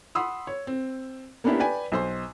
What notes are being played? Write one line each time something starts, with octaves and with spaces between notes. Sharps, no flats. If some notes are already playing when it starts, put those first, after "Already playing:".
F#5 B5 C6 D#6 E6
C#5
C4
A#3 B3 C#4 D4 E4 G4
B4 D5 G5 G#5
B1 C5 C6